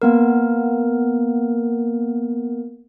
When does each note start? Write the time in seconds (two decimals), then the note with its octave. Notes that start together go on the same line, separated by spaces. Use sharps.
0.02 A#3 B3 A#4